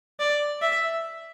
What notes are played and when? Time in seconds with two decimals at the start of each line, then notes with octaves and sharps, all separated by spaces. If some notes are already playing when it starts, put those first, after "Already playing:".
0.20 D5
0.62 E5